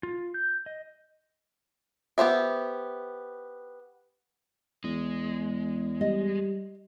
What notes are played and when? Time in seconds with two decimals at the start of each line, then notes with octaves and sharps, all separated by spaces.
0.03 F4
0.34 G6
0.66 D#5
2.18 B3 G4 C5 E5
4.84 E2 G#3
6.01 G3 D#5